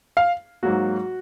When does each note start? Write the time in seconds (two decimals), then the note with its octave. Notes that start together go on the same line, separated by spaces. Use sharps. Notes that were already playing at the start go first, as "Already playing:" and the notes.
0.17 F5
0.63 G#2 F#3 A#3 F#4